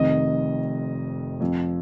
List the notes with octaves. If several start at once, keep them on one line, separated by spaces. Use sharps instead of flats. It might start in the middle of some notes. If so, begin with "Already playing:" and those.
Already playing: F1 F2 D#3 D#5
F2 F3